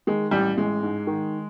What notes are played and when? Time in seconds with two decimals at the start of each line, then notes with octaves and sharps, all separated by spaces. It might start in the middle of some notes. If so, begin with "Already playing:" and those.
0.07 D#3 G#3
0.31 A1 G3
0.57 A1 G#3
0.83 G#2
1.07 D#3